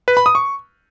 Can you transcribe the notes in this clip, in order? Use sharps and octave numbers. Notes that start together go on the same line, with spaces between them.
B4
B5
D#6
C#6